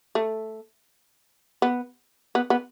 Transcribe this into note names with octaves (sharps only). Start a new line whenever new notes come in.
A3
B3
B3
B3